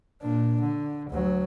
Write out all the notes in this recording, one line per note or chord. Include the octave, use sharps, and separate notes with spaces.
A#2 D4
D3
D2 F#3